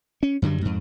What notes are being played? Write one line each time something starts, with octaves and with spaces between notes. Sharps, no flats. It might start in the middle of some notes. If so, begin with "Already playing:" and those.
C#4
F#2 D3 F#3 G3
F2 G#2